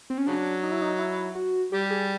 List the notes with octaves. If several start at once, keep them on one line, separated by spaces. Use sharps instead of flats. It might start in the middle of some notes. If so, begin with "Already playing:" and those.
C4
C#4
C#3 F#3 D4
D#4
E4
D#4
E4
F#4
G3 G4
G#4